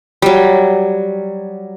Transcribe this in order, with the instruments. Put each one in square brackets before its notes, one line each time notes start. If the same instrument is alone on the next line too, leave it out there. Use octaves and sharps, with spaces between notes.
[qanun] F#3 G3